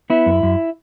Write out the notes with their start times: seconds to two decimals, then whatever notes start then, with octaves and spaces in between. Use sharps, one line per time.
0.10 B3 E4
0.26 F#2
0.43 F#2